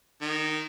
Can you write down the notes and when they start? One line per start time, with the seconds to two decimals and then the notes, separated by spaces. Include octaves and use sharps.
0.22 D#3